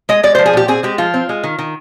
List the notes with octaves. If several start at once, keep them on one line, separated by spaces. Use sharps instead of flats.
G#3 D#5
G#3 D5
C5
F3
G#4
A#2 G4
C4 G#4
G#3 G4
F3 F4
C4
G#3
D#3
D#3